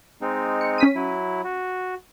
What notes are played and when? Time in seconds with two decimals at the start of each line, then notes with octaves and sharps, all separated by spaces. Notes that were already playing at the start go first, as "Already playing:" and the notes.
0.21 G#3 C4 D#4
0.61 C#7
0.78 C#4 B6 D#7
0.95 F#3 E4
1.44 F#4